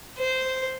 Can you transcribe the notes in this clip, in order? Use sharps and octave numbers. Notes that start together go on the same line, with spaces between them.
C5